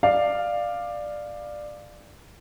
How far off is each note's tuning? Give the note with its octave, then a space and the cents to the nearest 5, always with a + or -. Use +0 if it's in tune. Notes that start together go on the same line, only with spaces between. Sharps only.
D5 +15 F5 +0